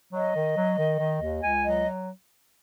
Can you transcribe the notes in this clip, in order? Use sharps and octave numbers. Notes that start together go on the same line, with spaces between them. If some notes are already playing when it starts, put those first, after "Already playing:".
F#3 D#5
D#3
F#3
D#3
D#3
D#2
C#2 G#5
F#3 D#5